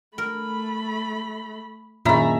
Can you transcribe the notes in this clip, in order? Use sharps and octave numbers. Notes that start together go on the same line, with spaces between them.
A3 A#4 B5
F#2 A#2 D#3 C4 G#4 E5 A#5 B5